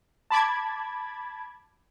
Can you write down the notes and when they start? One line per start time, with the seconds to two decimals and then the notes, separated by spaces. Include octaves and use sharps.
0.30 A5 B5 D6 G#6